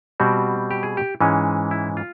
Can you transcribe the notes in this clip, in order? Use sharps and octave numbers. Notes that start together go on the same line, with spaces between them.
B2 G3 C4 F#4
G4
G#4
G4
G#2 E3 G#3 C#4
E4
F4